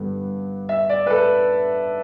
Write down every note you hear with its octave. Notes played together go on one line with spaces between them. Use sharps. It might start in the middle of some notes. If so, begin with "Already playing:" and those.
Already playing: G2 D3 G3 B3
E5
D5
B4
A4